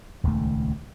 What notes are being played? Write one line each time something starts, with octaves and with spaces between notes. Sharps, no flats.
D#1 C#2 D#3 A3